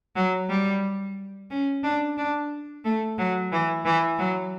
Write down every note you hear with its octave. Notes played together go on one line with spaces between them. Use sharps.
F#3
G3
C#4
D4
D4
A3
F#3
E3
E3
F#3